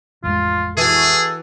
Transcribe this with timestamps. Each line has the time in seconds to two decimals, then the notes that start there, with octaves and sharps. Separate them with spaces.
0.24 A1 F2 G#3 F4
0.77 E3 F#4 G#4 A4